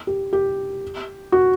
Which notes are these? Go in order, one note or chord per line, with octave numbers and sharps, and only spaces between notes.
G4
G4
F#4